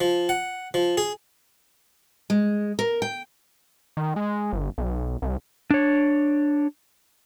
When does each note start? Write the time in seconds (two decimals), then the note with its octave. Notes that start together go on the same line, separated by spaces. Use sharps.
0.01 F3
0.29 F#5
0.74 F3
0.98 G#4
2.30 G#3
2.79 A#4
3.02 G5
3.97 D#3
4.16 G#3
4.53 G1
4.78 B1
5.22 C2
5.71 D4 C#5